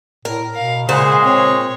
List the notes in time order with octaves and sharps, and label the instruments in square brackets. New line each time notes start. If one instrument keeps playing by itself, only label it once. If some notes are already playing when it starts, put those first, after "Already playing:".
[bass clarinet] A2 [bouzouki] A#4
[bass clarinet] B2 [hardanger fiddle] F5
[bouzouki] A#2 C5 [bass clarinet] C#3 [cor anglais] G#3 [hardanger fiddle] F#5 G#5
[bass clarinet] C4 [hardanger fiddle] C#5